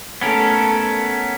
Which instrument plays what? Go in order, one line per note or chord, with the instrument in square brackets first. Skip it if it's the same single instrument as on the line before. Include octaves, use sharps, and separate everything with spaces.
[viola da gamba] A3 A4 [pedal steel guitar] B3 C#4 A#4